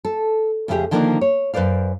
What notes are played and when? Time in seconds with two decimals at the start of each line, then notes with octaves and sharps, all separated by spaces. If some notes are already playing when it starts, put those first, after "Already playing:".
0.05 A4
0.68 F2 C#3 A3 D4 G4 G#4
0.91 D3 D#3 F3 A#3 C#4 D4
1.21 C#5
1.54 F#2 B4 C5 D5 F5